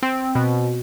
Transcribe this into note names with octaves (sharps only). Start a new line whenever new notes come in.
C4
B2